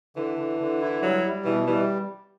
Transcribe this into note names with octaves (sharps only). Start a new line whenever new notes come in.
D3 E3
D3
D3
E4
F#3 G3
G3
B2 E3
E3 G3